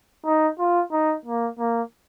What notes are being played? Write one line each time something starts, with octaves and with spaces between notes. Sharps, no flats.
D#4
F4
D#4
A#3
A#3